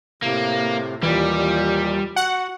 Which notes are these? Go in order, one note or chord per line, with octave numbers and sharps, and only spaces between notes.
A2 C3 A#3
D#2 A#2 E3 G3
F#4 F#5